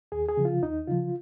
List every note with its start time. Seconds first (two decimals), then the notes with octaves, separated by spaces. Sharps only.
0.12 D#2 G#4
0.29 G#4
0.37 C#3 F3
0.45 F4
0.63 D#2 D#4
0.88 C#3 F3 F4